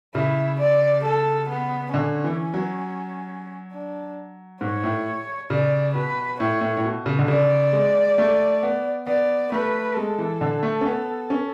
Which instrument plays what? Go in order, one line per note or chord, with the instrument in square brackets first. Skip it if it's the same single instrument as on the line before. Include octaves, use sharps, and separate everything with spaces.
[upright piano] C#3 [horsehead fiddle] E4
[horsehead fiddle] D5
A4
B3
[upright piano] D3 [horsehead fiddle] C#4
[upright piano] E3
F#3
[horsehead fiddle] D4
[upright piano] G#2 [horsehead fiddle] C#5
[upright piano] A2
[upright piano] C#3 [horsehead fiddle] D5
[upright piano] B2 [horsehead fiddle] B4
[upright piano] A2 [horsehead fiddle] C#5
[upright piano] A2
A2
B2
C#3
D3
[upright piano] C#3 [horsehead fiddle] D5
[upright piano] G#3
A3
B3
[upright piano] B3 [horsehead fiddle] D5
[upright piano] A3 [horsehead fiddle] B4
[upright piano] G#3 [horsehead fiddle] A4
[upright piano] E3
D3
A3
C#4
B3
C#4